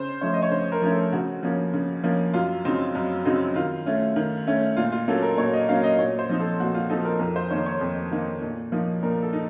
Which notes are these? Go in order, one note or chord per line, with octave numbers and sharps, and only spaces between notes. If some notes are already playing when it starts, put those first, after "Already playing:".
Already playing: C#3 C5
F3 A3 C#4 C#5
D#5
C#5
C#3 C5
A#4
F3 A3 C#4
A4
C#3 F#4
F3 A#3 C#4
C#3
F3 A#3 C#4
F#2 F4
C#3 F#3 C4 D#4
F#2
C#3 F#3 C4 D#4
D#3 F4
A3 C#4
D#3
A3 C#4
A#2 F4
F4
F#3 A#3 C#4 A4
A#4
A#2 C#5
D#5
F#3 A#3 C#4 F5
D#5
A#2 C#5
C5
F3 C4 D#4
A4
A#2 F#4
F4
F3 C4 D#4 A4
A#4
F2 A#4
C5
D#3 A#3 D#4 C#5
C#5
F2
D#3 A#3 D#4
A#2
F3 A#3 D#4
A#2 A#4
A4
D#4